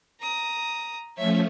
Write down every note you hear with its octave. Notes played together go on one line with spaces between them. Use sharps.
A#5 D#6
F3 A3 C#4 C#5 E5